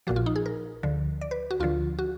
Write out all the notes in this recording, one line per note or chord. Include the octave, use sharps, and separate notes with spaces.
A#1 A#2 F3 F#4
F4
D#4
G#4
A#4
D2 D3 F3
D5
B4
F#4
D2 D3 F3 F4
F#4